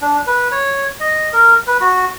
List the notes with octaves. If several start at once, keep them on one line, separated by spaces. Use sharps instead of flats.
D4
B4
C#5
D#5
A#4
B4
F#4